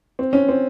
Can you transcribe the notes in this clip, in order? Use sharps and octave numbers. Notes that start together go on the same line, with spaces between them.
C4
C#4
C4